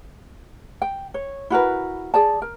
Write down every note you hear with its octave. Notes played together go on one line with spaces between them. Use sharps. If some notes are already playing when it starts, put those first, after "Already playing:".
G5
C#5
E4 F#4 A#4 B4
G#4 D5 A5
A#4